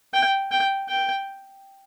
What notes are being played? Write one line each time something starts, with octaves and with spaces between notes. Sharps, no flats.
G5
G5
G5